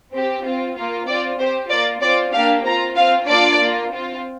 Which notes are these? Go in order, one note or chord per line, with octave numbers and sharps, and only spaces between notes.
C4 G4
C4 F4
A#3 F4
C4 F4 D5
C4 G4 C5
A#3 F4 D5
C4 F4 D5
A#3 D4 G4 F5
C4 F4 A#5
C4 F4 F5
A#3 D4 F4 D5
A#3 F4
C4 F4